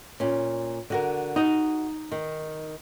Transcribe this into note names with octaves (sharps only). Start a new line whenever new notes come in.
A#2 C#4
D3 F#4 A#4
D#4 F#4 D#5
D#3